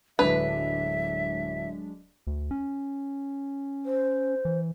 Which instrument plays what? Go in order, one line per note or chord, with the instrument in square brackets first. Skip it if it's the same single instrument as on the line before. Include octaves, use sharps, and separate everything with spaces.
[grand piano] D1 F7 [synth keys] F#3 G#3 D4 [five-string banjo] B4 [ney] E5
[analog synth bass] D2
C#4
[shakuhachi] C5
[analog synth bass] E3